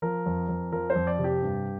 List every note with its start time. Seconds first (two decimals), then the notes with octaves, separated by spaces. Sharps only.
0.02 F3 A#4
0.26 F2
0.48 F2
0.72 F3 A#4
0.90 C5
0.96 F2
1.07 D5
1.19 C3
1.24 G4
1.42 G2